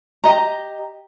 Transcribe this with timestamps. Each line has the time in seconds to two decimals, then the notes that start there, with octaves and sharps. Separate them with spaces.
0.24 G4 D#5 A#5